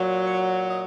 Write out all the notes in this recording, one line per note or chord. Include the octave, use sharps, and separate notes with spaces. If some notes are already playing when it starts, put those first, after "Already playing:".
Already playing: A#2 F#3
C#5
D#5